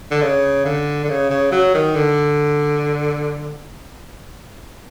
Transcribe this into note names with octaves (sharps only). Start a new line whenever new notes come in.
D3
C#3
D3
D3
C#3
C#3
F#3
D#3
D3